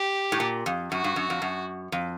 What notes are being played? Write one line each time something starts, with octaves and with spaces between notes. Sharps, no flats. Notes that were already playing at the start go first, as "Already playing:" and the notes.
Already playing: G4
A2
A#2
F2
F#2 F#4
G2
F#2
F2
F#2
F2